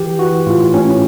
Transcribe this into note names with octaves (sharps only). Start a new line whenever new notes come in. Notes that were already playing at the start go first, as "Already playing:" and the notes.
Already playing: E3 G4
E3 F#4
A2 F4
A2 C#4